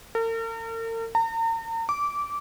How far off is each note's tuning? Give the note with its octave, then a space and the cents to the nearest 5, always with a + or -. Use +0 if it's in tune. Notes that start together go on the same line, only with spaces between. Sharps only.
A#4 -45
A#5 -45
D6 -15